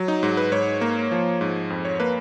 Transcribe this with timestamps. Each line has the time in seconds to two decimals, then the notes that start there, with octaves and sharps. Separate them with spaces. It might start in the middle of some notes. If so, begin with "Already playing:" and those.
Already playing: F#3
0.08 D#4
0.23 G#2
0.37 B4
0.52 G#2 C#5
0.81 A#3
1.12 F3
1.41 G#2
1.70 F2
1.85 C#5
2.00 A#3 B4